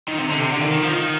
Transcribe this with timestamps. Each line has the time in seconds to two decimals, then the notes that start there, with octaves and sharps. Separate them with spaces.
0.08 D#3
0.19 C3
0.29 D3
0.40 C3
0.50 D3
0.61 D#3
0.71 D#3
0.82 F3
0.92 D#3